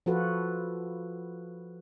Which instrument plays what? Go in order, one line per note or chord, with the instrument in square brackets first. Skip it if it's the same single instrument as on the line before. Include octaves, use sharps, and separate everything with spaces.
[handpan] F3 F4 F#4 A4 B4